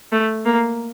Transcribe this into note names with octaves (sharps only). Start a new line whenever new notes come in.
A3
A#3